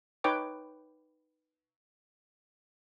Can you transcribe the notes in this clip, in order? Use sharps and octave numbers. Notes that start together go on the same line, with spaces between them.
D#4 B4 C#5 G5 D6